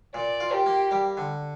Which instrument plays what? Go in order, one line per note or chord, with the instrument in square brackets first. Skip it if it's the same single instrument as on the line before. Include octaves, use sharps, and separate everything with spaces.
[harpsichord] A#2 [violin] D5
[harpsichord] F4
[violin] G4
[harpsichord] A#3
G3
D3